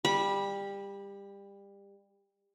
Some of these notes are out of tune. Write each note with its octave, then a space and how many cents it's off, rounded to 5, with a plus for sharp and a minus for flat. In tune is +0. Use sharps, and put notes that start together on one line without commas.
G3 +25 B5 -20